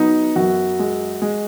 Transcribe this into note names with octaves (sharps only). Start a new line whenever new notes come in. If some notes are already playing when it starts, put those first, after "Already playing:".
Already playing: F#3 B3 D#4
F#2 F#4
G#3
G#3